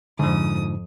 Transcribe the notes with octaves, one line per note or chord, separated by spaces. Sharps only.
F2 G#2 D3 F3 D#6